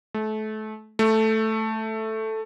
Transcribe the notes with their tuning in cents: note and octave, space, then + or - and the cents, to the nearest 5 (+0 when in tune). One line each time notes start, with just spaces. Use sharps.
A3 -30
A3 +0